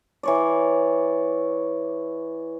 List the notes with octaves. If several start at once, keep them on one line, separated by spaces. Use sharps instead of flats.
E3 C#5 D5